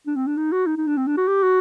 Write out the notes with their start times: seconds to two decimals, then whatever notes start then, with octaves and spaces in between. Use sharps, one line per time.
0.07 D4
0.16 C4
0.27 D4
0.37 D#4
0.52 F#4
0.67 D#4
0.77 D#4
0.87 D4
0.97 C4
1.07 D4
1.17 F#4
1.28 G4
1.43 F#4